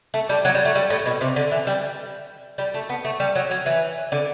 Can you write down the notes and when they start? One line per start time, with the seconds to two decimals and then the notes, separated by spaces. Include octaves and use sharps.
0.14 A3
0.29 G3
0.45 F#3
0.55 G3
0.65 A3
0.75 G3
0.90 A2
1.06 B2
1.21 C3
1.36 D3
1.52 E3
1.67 G3
2.58 G3
2.74 A3
2.89 B3
3.05 A3
3.20 G3
3.35 F#3
3.51 F#3
3.66 E3
4.12 D3